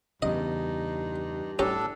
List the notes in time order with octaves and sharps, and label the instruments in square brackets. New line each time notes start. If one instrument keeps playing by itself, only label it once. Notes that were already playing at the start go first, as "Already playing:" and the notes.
[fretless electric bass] E2 C#3 [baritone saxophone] G2 [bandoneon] D#4 [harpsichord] D#5
[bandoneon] A2 D4 A4 [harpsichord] C#4 G4 A#5